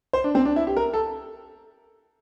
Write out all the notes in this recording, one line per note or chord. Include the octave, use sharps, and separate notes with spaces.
C5
D4
C4
D4
E4
G4
A#4
A4